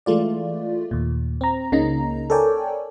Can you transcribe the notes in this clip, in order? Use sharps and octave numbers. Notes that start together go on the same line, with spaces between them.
E3 G#3 A3 F4 D5
D#2 A#2
C4 A#5
C#2 C#3 A#3 D#4 A#5
A4 A#4 C#5 D5 G5 G#5